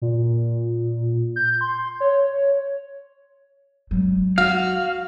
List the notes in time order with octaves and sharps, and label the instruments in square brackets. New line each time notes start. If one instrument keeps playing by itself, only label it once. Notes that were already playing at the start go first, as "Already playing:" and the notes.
[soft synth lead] A#2
G6
C6
C#5
[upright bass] F#3 G#3
[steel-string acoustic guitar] F#4 [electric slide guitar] F5